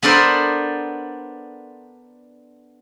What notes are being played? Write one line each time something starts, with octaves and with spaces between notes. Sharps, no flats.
B3 D4 A4 A#4 C5